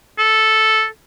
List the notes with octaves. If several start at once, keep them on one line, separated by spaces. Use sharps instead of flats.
A4